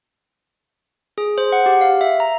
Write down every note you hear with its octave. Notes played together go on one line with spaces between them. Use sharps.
G#4
C5
F#5
G4
F5
E5
A#5